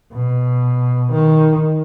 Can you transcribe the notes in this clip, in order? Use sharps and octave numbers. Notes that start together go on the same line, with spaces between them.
B2
D#3